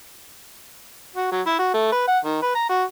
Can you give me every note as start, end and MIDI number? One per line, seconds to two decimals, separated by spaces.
1.16 1.28 66
1.32 1.41 54
1.46 1.55 64
1.59 1.73 66
1.74 1.89 57
1.92 2.06 71
2.07 2.18 78
2.25 2.42 51
2.42 2.55 71
2.55 2.65 82
2.69 2.83 66